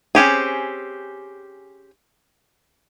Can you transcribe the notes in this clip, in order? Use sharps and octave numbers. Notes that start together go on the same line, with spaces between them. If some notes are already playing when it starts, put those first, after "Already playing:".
C4 C#4 G4 G#4